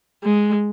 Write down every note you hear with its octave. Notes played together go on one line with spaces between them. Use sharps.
G#3